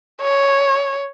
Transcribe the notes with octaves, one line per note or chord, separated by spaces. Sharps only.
C#5